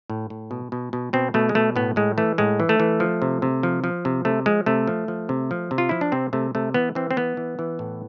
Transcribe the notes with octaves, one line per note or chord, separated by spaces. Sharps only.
A2
A2
B2
B2
B2
B2 C4
B2 A3
G#3
B2 A3
A2 B3
A2 G#3
E3 A3
A2 G#3
E3
A3
E3
F3
C3
C3
F3
F3
C3
C3 A3
F3 G#3
C3 A3
F3
F3
C3
F3
C3
F4
F3 E4
D4
C3 C4
C3 A3
C3 A3
E3 B3
E3 C4
C4
E3 B3
E3
E3
A2